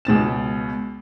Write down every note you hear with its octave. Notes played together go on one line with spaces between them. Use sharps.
C#2 B2 A6 E7